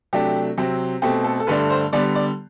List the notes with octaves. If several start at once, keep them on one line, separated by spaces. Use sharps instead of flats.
C3 F#3 A3 D4 G4
C3 F#3 C4
B2 A3 C4 G4
A4
A4
G2 D3 A3 D4 B4
C5
D3 G3 B3 D5
D5